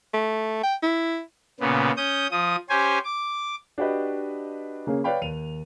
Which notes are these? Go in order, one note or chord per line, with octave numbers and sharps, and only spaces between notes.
A3
G5
E4
A#2 C#3 B3
C#4 D#6 G6
F3 D#6
C#4 G4 C5 G#5
D6
D4 F#4 G4 B4 D#5
C#3 A#3 C#4 G#4
B4 C#5 D5 F5 G5 B5
D#2 D#7 F7